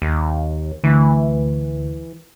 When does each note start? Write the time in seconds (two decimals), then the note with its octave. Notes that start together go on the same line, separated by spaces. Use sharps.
0.02 D#2
0.84 D2 E3